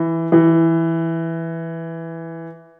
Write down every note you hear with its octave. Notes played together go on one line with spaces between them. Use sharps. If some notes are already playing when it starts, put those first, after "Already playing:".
Already playing: E3
E3